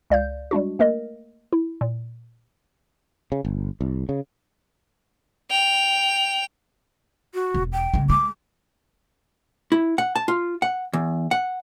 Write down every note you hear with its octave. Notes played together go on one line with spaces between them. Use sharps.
C#2 D5 F5 G6
G3 G#3 D4 F#4
A3 A#3 A#4 D#5
E4
A#2
C#3
G1
C2
C#3
G5 F7
F#4
E1
G5
C#3 G#3
G#3 D6
E4
F#5
A5
F4
F#5
E2
F#5